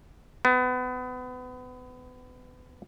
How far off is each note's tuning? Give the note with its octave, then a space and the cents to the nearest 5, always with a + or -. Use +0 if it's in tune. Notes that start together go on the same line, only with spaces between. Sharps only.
B3 +30